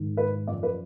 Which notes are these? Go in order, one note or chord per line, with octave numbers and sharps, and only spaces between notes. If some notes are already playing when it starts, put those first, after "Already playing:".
Already playing: G#2 D#3
B4
F#2 F3 D5
B4